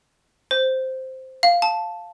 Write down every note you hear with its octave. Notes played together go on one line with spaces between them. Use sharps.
C5
F5
A5